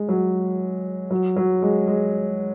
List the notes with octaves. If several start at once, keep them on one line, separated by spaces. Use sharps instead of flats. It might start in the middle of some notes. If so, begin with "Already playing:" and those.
Already playing: G#3
F#3
F#3
F#3
G#3
G#3